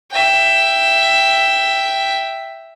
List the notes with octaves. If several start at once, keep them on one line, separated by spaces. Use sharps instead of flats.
E5 G5